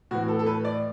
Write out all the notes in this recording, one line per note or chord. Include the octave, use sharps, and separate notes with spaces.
A2 E3 F#4
A4
A4
B4
D5